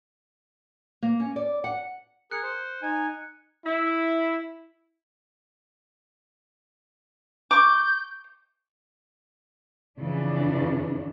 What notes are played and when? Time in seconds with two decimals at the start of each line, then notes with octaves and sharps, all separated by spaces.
1.02 A#3
1.20 C#4
1.36 D5
1.64 F#5
2.31 G#4 A#4 F#6 C#7
2.43 C5
2.82 D#4 G#5
3.64 E4
7.51 C#6 D6 G6
10.01 F2 C#3 E3 D4